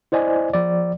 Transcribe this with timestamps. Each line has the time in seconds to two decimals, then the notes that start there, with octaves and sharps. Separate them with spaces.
0.12 E4 C5 D5 D#5 G#5
0.54 F3 D5